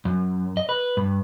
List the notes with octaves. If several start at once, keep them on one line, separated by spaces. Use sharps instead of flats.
F#2
D#5
B4
G2